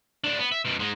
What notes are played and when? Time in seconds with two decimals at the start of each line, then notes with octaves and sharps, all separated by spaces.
0.24 A2 D4
0.39 B3
0.52 E5
0.65 F#2 B2
0.79 G#2 G#3